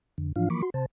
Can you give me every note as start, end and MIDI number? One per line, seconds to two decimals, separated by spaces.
0.18 0.33 41
0.18 0.33 50
0.36 0.49 44
0.36 0.49 52
0.36 0.49 53
0.36 0.49 62
0.36 0.49 65
0.36 0.49 77
0.50 0.62 52
0.50 0.62 53
0.50 0.62 58
0.50 0.62 83
0.50 0.62 85
0.50 0.62 86
0.62 0.70 66
0.62 0.70 84
0.74 0.86 48
0.74 0.86 72
0.74 0.86 81